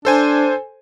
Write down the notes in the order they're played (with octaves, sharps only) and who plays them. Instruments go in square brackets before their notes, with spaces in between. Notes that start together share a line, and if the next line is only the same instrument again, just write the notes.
[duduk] D4 [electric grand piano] A4 C5 G#5